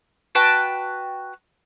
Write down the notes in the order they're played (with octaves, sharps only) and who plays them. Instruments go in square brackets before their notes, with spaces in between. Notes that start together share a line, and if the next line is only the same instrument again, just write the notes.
[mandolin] F#4 B4 G5 A5